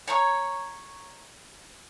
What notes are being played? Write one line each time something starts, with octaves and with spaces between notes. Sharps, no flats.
C#5 A#5 C#6